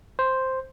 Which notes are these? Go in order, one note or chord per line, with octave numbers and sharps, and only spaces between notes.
C5